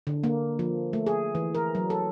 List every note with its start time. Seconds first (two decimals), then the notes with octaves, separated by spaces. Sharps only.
0.07 D3
0.24 A#3
0.59 F3
0.93 A3
1.06 G#4
1.35 E3
1.55 A#4
1.75 F#3
1.90 A4